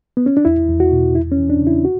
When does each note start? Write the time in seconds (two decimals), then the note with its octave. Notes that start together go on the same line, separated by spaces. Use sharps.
0.17 B3
0.26 C#4
0.37 D4
0.45 E2 E4
0.69 E2
0.80 F#4
0.92 B2
1.15 E2 E4
1.32 C#4
1.38 E3
1.50 D4
1.61 C#3
1.67 E4
1.85 F#4